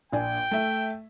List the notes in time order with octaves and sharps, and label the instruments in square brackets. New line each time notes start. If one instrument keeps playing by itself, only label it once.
[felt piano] A#1 D4 G#5 [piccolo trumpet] G5
[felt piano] A3 E5